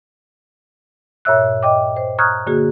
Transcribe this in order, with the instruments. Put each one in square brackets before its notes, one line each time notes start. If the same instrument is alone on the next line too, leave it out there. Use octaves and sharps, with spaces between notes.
[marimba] G2 A#2 C#5 E5 E6 F#6
D#5 G5 D6
C5
A#5 C#6 D#6 F6 F#6 G#6
D3 A#3 F#4 G#4